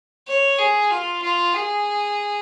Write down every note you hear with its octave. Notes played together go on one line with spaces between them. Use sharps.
C#5
G#4
F4
F4
G#4